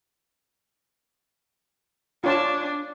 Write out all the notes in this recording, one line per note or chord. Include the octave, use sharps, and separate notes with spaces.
D4 F4 C#5 A5